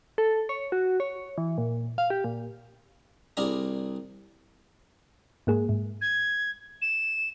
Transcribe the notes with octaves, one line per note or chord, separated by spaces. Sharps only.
A4
C#5
F#4
C#5
E3
A#2
F5
G4
A#2
C2 D4 G#4 A#4 A#5
G#2 A#3 G#4
G#2
G#6
E7